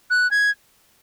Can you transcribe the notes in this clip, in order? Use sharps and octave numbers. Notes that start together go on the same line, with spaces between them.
F#6
G#6